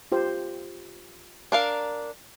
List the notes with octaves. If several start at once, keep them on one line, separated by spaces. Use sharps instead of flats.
F4 G4 C5
D4 A#4 F5